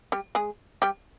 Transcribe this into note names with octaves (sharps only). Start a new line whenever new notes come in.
G3 G4
G#3 G#4
G3 G4